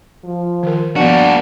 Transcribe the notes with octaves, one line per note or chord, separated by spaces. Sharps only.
F3
D#3 A#4
F3 A#3 B3 D4 F#4